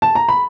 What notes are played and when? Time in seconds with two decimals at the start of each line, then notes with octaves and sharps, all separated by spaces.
0.02 A5
0.15 A#5
0.29 B5